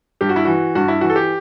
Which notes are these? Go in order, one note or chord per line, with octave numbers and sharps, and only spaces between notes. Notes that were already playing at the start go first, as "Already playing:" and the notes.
G2 G4
F#4
E4
E3 F#4
G2 F#4
E4
E3 F#4
A4
G4